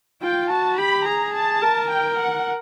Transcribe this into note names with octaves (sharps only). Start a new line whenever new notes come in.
F4 G5
F#4 A5
G4 B5
G#4 A#5
A5
A#4
G5
F#5